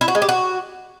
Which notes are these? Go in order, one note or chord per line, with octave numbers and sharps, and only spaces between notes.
E4
F#4
G#3
G4
F#4